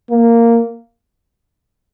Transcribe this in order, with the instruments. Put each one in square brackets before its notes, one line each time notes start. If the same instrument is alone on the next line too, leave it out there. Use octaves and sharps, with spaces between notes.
[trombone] A#3